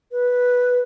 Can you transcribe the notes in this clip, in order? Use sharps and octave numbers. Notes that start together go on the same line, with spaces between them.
B4